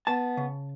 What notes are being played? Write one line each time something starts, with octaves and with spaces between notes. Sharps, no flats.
B3 A5
C#3